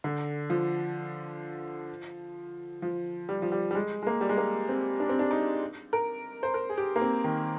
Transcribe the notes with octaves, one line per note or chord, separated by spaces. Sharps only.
D3
F3
F3
G3
F3
G3
G3
G#3
G#3
A#3
G3
G#3
A#3
C4
D4
C4
D4
D#4
A#4
C5
A#4
G#4
G4
A#3
C4
D#3